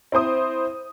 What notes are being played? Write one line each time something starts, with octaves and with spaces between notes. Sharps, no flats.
C4 E4 C5 D#6